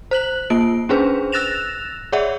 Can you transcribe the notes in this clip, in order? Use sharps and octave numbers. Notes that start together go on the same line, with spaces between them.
C5 F#6 F#7
A#3 F4 D7
C#4 D4 G#4 B4 C5
E6 F#6 A6 A#6 E7 F7
G#4 C#5 D5 E5 F#5